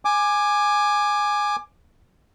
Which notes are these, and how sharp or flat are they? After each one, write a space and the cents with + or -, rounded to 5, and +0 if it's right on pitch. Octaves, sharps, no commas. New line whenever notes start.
G#5 +0 D6 +20